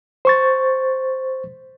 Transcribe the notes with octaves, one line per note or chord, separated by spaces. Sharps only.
C5 C#6 A6